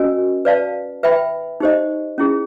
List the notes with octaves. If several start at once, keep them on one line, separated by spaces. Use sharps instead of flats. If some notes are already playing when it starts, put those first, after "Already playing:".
Already playing: C#4 F#4 A#4 D#5 G#5
B4 D5 F5 A5
B4 E5 G5 B5
D#4 G4 C5 D#5
C#4 E4 G#4